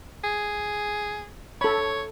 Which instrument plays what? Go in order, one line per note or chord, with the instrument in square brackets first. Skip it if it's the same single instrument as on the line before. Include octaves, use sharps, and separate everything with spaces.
[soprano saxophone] G#4
[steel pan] A4 B5 [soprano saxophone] C#5